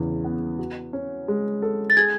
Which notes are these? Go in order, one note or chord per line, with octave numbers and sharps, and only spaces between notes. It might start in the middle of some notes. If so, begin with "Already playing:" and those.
Already playing: E2 C#3 E3
B3
F#4
C#4
G#3
A4
A6
G#4 G#6